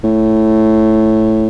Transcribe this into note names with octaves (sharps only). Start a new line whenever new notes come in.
A2